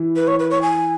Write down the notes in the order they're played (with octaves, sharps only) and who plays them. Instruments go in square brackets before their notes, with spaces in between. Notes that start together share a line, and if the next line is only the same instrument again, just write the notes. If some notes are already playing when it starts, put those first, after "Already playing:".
Already playing: [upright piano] E3
[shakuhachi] B4
C#5
B4
C#5
G#5